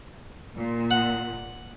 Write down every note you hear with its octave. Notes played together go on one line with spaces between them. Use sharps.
A#2
F#5